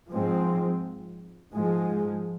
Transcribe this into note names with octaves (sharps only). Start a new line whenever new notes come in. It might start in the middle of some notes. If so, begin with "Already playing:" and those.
G#2 F3 G#3 C4
G#2 F3 G#3